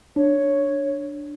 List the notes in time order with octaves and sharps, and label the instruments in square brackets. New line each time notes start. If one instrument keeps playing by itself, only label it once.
[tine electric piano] D4 [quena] C#5